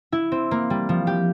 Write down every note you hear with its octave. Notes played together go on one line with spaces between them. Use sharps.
E4
C4
A#3
G3
F3
G4